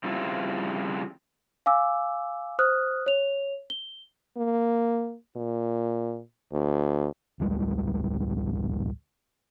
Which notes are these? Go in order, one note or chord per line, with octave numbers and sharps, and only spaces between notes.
C#3 F3 G3 C4 E4 F4
F5 G#5 D6 E6
C5 D#6 F6 F#6
C#5 F7
G7
A#3
A#2
D2
A1 D2 G3 G#3